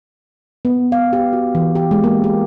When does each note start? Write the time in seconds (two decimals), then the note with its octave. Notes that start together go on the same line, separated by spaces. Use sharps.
0.65 B3
0.92 F5
1.13 G4
1.33 F#4
1.55 E3
1.75 G4
1.91 G#3
2.04 A#3
2.24 G4